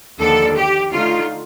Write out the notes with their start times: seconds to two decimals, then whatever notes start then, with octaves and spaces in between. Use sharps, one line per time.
0.19 D#2 D3 F3 A#3 D4 A4
0.56 G4
0.92 D3 A3 D#4 F4